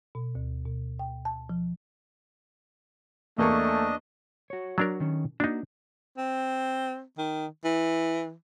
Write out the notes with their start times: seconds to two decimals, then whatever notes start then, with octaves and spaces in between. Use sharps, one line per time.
0.15 B2
0.35 D2
0.65 B2
0.99 G5
1.25 A5
1.49 F3
3.38 E2 A3 A#3 D4 D#5 C#6
4.50 F#4 C#5
4.78 F#3 D4 A#4
5.00 D#3 C#4
5.40 A#3 D4 D#4 F#4
6.17 C4
7.17 D#3
7.64 E3